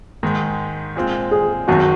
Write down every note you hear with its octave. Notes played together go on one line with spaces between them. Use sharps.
G#2 D#3 G#3
A#2 G#3 C4 F4
G#4
G#1 F#2 D#3 F#4